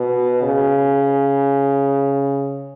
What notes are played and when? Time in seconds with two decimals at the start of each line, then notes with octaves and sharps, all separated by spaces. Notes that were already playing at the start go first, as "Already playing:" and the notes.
Already playing: B2
0.42 C#3